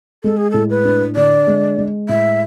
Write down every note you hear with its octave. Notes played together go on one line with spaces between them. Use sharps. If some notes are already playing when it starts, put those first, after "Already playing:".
G#3 A4
G#4
A2 A4
B4
D4
D3 D5
G#3
G#3
A2 E5